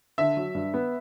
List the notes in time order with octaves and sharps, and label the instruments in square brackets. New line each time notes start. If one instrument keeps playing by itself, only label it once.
[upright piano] D3 [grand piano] E5
[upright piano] F#3
G2
B3